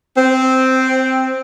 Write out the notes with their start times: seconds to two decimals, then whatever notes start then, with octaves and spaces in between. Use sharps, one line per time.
0.17 C4